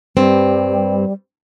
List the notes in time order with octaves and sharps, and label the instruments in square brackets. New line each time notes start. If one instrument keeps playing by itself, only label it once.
[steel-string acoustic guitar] G2 C4 [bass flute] G3